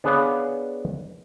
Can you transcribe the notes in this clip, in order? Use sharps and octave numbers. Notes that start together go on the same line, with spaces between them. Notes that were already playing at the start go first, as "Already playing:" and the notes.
B3 D4 G#4 B4 C#5 F5